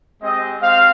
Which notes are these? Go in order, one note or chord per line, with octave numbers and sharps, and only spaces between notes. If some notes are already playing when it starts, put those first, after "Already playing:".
G#3 C4 G4 D#5
C4 G4 F5